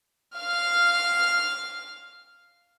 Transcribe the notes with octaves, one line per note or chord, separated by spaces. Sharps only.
F5 F6